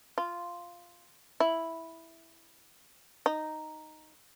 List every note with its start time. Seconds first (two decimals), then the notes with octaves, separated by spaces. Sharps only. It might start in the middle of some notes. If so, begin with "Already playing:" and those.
0.18 F4
1.40 E4
3.26 D#4